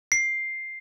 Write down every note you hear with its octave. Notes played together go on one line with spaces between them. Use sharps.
C7